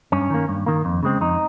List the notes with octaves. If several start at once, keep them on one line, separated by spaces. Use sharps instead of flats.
G2 C#4
D#3 A#3
G2
D#3 A#3
F2
C#3 G#3 C4
F2 D#4